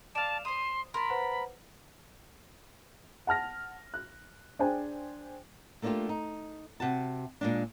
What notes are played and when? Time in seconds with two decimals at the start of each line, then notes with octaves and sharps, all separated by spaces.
0.15 D5 F5 A5 E7 F7
0.45 C5 C6 D#6
0.94 A#4 A5 B5 C6
1.10 B4 C5 F#5
3.27 F#5 A5 F6 A#6
3.94 F#6
4.59 D4 G#4 C5 G5 G#5
5.82 A3 A#3 D4 D#4 F4 G4
6.09 D#4
6.80 C3 F#4 A5
7.41 A#2 G#3 D4